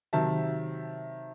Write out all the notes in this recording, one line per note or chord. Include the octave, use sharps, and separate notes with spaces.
C3 D#3 F#3 E5 A5